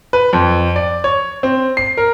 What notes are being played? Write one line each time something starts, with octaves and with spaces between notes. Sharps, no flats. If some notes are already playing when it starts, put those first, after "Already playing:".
B4
F2
D5
C#5
C4
C7
A#4